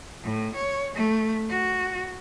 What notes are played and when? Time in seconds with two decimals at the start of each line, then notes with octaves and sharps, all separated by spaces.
0.23 A2
0.55 C#5
0.95 A3
1.49 F#4